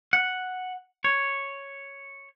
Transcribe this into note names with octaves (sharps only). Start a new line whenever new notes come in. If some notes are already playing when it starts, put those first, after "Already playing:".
F#5
C#5